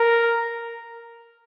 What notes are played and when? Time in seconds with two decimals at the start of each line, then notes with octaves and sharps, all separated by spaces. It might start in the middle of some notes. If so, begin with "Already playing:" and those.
Already playing: A#4